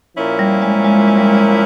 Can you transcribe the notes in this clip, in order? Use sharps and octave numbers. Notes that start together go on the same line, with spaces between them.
A#2 F3 A#3 C#4 E4
G3
G#3
G#3
G#3
G3
G#3